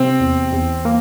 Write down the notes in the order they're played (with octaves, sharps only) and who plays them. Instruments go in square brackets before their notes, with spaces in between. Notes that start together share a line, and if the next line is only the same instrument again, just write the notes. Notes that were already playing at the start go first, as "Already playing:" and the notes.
Already playing: [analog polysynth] C3 [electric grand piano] C4
[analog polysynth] E2
E2
A#3